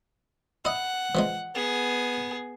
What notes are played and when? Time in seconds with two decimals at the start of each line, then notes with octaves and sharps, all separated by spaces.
0.65 E4 D#5 F#5
1.15 E3 F3 G#3
1.55 B3 G#4